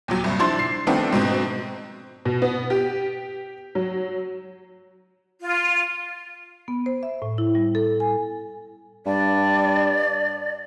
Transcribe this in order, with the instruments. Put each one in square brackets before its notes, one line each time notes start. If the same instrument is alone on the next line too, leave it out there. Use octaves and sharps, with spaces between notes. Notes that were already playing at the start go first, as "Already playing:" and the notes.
[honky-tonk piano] D#2 A#2 F#3
C2 G2
F3 D4 E4 C6 A6
C7
D#3 F3 A3 B3 C4 D4
G#2 B2 C4
B2
B3
G4
F#3
[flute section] F4
[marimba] B3
C5
E5
A2
E4
G3
A4
G#5
[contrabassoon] G2 [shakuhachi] D5